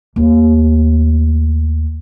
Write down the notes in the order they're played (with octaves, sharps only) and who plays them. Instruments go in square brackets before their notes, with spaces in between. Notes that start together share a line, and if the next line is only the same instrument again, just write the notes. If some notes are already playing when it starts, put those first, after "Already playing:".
[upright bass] D#2 A3